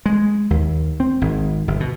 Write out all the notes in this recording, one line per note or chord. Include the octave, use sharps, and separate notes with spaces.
G#3
D#2
C4
G#1
G1
B2